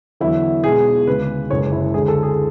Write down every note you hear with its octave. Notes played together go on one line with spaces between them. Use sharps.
E2 D3 F#3 E4
B1 B2 G#3 G#4
D2 C#3 G#3 B4
F#1 F#2 D3 G#3 C#5
E4
D2 D3 G#3 G#4
A4
G#4